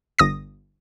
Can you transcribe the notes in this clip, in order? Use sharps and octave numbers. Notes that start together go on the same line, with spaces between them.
G1 D#6 A#6